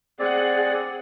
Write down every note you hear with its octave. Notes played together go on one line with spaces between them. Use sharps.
C4 G#4 D5 F#5